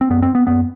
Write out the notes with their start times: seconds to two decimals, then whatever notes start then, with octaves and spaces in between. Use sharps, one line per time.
0.01 C4
0.10 F#2 B3
0.22 C4
0.35 B3
0.47 F#2 B3